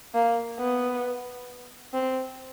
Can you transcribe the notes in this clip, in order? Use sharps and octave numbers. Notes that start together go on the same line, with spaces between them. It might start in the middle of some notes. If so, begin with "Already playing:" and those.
A#3
B3
C4